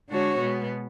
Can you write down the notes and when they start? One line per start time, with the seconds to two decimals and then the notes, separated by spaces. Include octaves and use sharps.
0.09 D3 G#3 D4 F#4 C#5
0.39 B2 G#3 B3